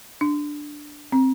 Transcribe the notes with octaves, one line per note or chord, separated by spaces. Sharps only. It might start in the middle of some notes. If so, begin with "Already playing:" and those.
D4
C4